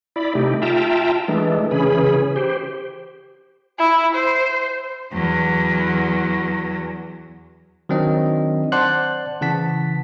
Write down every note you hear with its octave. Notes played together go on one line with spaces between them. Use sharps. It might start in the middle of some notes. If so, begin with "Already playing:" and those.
E4 D5 B5
C3 A3 D#4 G4
F4 E5 G5 A5 A#5
E3 G#3 A3 D4
C#3 E3 C#4 G#4 B5
G4 C5
E4
C5
E2 F#3
D#3 F#3 C4 D4 D#5
C5 D5 F#5 A5 C6 F#6
C#3 E3 F#5 A5 B6